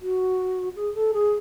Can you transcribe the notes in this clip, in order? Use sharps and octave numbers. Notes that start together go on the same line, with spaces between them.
F#4
G#4
A4
G#4